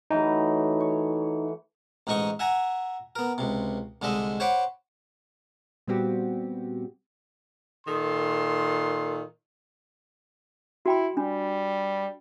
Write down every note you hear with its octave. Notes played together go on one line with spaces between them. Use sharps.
E3 F#3 A3 D#4
C#5
A1 G#2 D#4 D#5 C#6 D#6
E5 F#5 G#5 A#5
B3 A#4
C#2 C3
C2 D3 G#3 D#5 E5
C5 C#5 F#5 B5 D6
A#2 G3 B3 C4 F#4 G4
A#2 D#3 A4 C6
E4 F#4 G5 B5
G3 D4